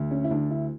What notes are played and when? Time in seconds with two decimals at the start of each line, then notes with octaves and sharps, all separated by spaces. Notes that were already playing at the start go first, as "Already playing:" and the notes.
Already playing: D2
0.11 C#4
0.24 E4
0.31 D2 D4
0.51 E4